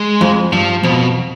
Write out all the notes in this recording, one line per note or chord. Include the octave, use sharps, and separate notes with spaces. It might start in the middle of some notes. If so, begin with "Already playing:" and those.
Already playing: G#3
F2
G2 F3
F2 B2